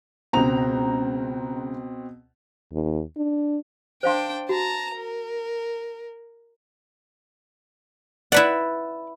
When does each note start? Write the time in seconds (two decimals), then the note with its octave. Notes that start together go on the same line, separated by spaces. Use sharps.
0.33 C#2 B2 C4 A#5 F7
2.73 D#2
3.17 D4
4.03 D4 C5 F5 G5 C6
4.49 F#4 A5 A#5
4.95 A#4
8.32 E4 B4 D5 F#5